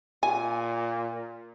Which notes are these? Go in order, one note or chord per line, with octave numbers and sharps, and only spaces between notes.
A#2 G#5